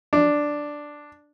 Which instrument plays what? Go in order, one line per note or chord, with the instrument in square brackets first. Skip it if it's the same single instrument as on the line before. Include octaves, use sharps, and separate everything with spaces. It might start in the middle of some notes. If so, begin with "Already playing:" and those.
[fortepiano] D4